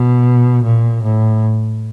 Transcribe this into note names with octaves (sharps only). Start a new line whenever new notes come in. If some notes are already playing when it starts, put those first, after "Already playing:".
Already playing: B2
A#2
A2